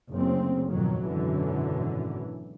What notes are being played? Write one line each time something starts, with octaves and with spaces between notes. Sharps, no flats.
F#1 D2 C4
B1 F2 G#2 D#3 F#3
G#1 F#2 B2 D3 E3